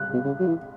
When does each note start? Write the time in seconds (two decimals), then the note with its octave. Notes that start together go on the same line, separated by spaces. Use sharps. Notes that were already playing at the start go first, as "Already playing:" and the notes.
Already playing: F#6
0.14 B2
0.25 C#3
0.40 F#3
0.47 E3